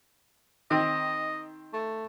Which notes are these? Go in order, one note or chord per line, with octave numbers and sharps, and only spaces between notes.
D#3 C4 D#5
A3